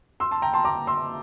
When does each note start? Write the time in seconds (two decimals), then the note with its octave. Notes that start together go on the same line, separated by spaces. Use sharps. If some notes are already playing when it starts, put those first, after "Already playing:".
0.20 C6 E6
0.31 A5 C6
0.42 G5 A#5
0.54 A5 C6
0.65 A#5 D6
0.87 C6 E6